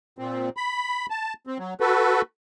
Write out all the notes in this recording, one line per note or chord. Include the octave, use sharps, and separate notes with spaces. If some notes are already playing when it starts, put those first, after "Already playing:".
A#2 C4
B5
A5
C4
F#3
F#4 A4 B4